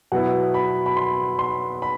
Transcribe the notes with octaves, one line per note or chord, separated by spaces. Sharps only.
B2 F#3 B3 E4 F#5
B5
B5
C6
C6
B5